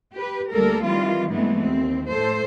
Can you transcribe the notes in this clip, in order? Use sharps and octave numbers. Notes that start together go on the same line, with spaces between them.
G4 B4
D2 G3 A#3 A4 A#4
D#3 E3 G3 C4 F4
G2 E3 G#3 A3 B3 C4
D#2 C4
A2 A4 C5